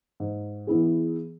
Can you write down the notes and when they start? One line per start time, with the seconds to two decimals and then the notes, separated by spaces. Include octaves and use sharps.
0.20 G#2
0.67 E3 B3 E4 G#4